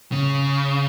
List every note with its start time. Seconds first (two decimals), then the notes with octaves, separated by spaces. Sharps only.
0.12 C#3